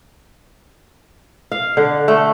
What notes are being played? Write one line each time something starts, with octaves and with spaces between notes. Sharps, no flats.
F5
D3
A3